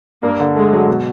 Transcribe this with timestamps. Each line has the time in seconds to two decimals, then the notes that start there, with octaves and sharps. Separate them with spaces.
0.23 G2 A#3
0.40 D3
0.56 G#3 A3
0.72 F#3
0.88 B2